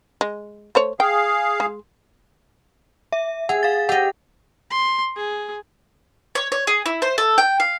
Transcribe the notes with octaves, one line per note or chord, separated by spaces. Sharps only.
G#3
A3 C5 C#5
G#4 F5 G5
G#3
E5
G#4 F#5
F5 A6
G4 D#5 F#5
C6
G#4
C#5
C#5
G#4
E4
C5
A4
G5
F5